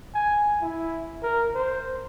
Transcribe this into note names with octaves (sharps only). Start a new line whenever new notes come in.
G#5
E4
A#4
C5